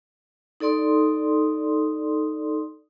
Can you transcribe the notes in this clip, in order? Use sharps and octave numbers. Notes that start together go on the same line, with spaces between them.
D#4 A4 D5 C6 D#6